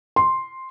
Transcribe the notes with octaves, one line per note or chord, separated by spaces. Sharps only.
C6